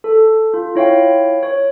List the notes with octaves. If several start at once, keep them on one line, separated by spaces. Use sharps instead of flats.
A4
F4
E4 C#5 F5 G5
C#5